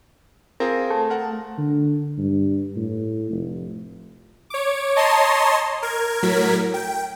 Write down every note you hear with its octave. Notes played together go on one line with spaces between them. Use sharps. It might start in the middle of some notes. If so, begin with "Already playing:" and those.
C4 F4 G#4 A#4
A3
A#4 F#5 A5
D3
G2
A2
F1
C#5 D6
C#5 D#5 A5 A#5 C6
A#4 G#6
A2 F#3 A#4 G#6 B6
G5